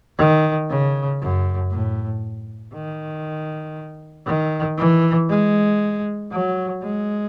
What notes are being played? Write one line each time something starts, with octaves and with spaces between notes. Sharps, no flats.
D#3
C#3
F#2
A2
D#3
D#3
E3
G#3
F#3
G#3